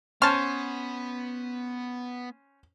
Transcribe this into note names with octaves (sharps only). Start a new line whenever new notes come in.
B3 C#4 C5 C#5 A5 F6